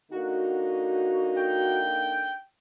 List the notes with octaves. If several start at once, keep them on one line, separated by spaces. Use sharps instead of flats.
D3 A#3 D#4 F#4
G5